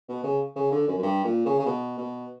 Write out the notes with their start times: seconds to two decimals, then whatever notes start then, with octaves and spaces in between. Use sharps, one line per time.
0.08 B2
0.24 C#3
0.56 C#3
0.71 D3
0.88 F#2
0.98 F#2
1.03 G2
1.24 A#2
1.46 C#3
1.59 C#3
1.66 B2
1.98 B2